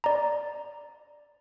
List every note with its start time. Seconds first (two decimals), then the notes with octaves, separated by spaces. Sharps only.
0.04 D5 A#5